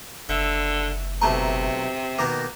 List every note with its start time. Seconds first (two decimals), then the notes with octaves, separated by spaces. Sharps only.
0.29 F#1 D3 E5
1.21 B1 C3 A3 A5 A#5 C#6
2.19 B2 D#3 A#3 D6